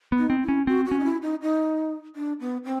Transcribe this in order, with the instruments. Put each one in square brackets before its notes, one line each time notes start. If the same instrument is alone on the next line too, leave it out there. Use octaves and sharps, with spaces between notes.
[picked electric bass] B3
[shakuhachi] D#4
[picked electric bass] C4
[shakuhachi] E4
[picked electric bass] C#4
[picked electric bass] C4 [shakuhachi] F#4
[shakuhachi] F#4
[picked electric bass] C#4
[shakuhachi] D#4
E4
D#4
D#4
D4
B3
C4